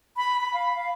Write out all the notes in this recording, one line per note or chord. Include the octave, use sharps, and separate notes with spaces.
B5
B5
F5
F5